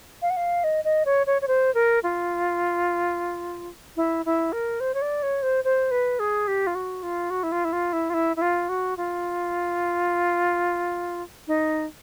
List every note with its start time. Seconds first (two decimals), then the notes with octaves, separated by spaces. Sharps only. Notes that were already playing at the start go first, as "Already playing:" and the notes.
0.22 F5
0.30 F#5
0.37 F5
0.64 D#5
0.84 D#5
1.05 C#5
1.27 C#5
1.42 C#5
1.48 C5
1.74 A#4
2.03 F4
3.97 E4
4.26 E4
4.53 A#4
4.80 C5
4.94 C#5
5.02 D5
5.23 C#5
5.42 C5
5.64 C5
5.91 B4
6.19 G#4
6.48 G4
6.67 F4
6.75 F#4
7.03 F4
7.30 F#4
7.43 E4
7.52 F4
7.65 E4
7.73 F4
7.93 E4
8.10 F4
8.14 E4
8.36 E4
8.42 F4
8.69 F#4
8.97 F4
11.47 D#4